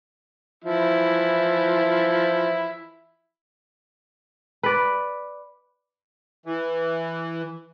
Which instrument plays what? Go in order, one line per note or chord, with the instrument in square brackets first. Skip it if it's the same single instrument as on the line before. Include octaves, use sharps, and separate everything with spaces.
[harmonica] E3 F3 E4
[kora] B4 D5
[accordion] E3